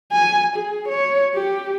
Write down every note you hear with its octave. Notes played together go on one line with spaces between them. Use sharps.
G#5
G#4
C#5
G4